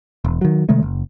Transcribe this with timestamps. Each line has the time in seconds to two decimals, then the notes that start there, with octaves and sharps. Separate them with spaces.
0.25 E1
0.41 D#3 F#3
0.69 C3 D#3 G#3 A3
0.83 F#1